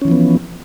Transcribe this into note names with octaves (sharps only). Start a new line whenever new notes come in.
E3 F3 B3 C#4